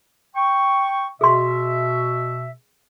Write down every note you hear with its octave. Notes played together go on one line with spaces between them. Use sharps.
G5 C#6
B2 G#4 E5 C6